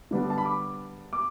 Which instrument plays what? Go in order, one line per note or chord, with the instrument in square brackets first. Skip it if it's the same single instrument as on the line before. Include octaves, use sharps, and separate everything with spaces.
[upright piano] D3 G3 B3 D4
A5
B5
D6
D6